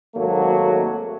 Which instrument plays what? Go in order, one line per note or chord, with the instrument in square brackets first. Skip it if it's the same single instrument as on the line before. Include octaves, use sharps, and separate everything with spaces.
[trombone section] G#1 F#3 A3 A#3